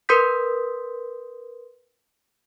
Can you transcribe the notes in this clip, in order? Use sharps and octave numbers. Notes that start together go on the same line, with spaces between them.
A#4 B4 C6 D#6 G6 B6